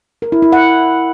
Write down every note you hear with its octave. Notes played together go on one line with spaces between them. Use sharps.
A#4
E4
E4
F#5